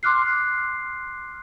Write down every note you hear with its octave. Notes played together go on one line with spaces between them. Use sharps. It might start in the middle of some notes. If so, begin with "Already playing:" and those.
C6 D6 F6 F#6 C7